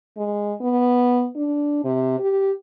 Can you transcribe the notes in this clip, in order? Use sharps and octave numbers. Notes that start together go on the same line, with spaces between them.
G#3
B3
D4
C3
G4